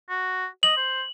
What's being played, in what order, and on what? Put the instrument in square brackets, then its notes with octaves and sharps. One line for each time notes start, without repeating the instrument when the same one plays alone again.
[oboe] F#4
[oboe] D#5 [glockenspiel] F#7
[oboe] C5